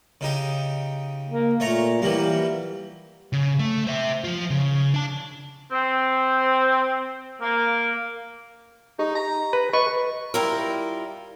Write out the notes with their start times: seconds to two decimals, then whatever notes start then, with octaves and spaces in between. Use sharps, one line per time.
0.21 C#3 D#4 G4
1.29 A#3
1.60 A#2 A3 C#5 A#5
2.02 E3 F#3 G3 A#3
3.33 C#3
3.59 A3
3.87 C5 E5
4.24 F3 F4
4.50 C#3
4.94 D4 A5
5.71 C4
7.41 A#3
8.99 D#4 G4
9.16 A#5
9.53 B4
9.73 B4 D#5 C#6
10.34 G3 E4 F4 A#4